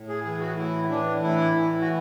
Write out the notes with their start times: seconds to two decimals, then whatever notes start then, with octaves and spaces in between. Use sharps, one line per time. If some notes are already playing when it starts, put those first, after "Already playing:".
Already playing: A2
0.08 G#4
0.24 E3 G#4
0.40 F#4
0.57 A2 E4
0.90 E3 D4
1.22 A2 E4
1.56 E3
1.81 F#4